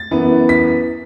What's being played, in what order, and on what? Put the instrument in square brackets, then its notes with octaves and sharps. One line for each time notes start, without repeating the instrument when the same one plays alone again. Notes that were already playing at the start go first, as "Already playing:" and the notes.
Already playing: [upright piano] A6
F#2 E3 B3
B6